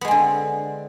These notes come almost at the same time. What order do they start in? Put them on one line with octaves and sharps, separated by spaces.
B3 G#3 C4 D3